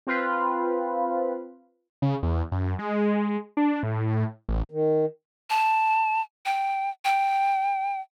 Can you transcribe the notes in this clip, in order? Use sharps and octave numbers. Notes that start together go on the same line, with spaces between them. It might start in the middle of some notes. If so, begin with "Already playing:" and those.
C4 F4 B4
C#3
E2
F#2
G#3
D4
A2
A1
D#3
A5
G5
G5